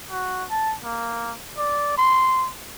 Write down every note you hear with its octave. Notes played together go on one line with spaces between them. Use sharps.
F#4
A5
A#3
D5
C6